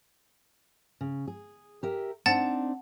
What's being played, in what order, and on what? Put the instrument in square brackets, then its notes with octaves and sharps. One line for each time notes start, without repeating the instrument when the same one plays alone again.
[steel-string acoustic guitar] C#3
G#4
G4 A#4 E5
[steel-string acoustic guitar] C4 D4 D#4 [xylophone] F#5 A5 A6